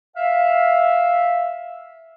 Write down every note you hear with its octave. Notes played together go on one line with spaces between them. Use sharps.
E5 F5